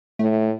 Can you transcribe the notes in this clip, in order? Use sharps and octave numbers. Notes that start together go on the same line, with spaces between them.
A2 A3